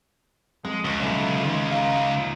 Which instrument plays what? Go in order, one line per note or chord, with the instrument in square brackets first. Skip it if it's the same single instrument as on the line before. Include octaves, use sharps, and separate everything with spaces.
[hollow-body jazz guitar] F2 [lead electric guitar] G#3
[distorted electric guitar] C#2 [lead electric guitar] C#4 F#4
[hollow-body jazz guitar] B1 [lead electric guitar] D3 A3
[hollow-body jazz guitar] D#3 [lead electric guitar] D#4 F4
[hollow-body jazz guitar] F5 A#5